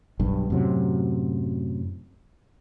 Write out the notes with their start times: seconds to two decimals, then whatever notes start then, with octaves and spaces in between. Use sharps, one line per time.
0.20 B1 G2
0.50 F#2 A2 C3 F#3